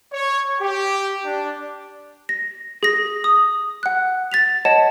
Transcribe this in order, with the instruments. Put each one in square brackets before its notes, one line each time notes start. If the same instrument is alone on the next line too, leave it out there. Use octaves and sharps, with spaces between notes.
[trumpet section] C#5
G4
D4
[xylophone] A#6
G#4 A#6
D#6
F#5 F#6
A6 B6 F7
C#5 D#5 F#5 A5